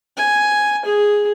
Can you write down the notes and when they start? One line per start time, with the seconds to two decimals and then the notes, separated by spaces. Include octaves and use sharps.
0.17 G#5
0.85 G#4